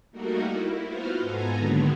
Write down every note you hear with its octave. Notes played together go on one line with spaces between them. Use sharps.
G3 A3 A#3 D#4 F#4 A#4
E4
B3 F4 F#4 B4 C5 F5
G#2 B3 A4 G#5 A#5
D3 D#3 F#3 G#3 A#3 B3